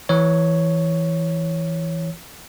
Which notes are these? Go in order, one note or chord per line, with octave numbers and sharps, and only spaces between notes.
E3 C#5